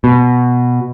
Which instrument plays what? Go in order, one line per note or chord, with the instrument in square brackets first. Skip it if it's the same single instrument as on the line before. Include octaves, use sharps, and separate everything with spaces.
[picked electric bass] B2